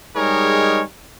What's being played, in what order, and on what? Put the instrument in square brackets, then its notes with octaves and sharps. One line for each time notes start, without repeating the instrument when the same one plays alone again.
[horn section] G3 G#3 D#4 G#4 A#4 C#5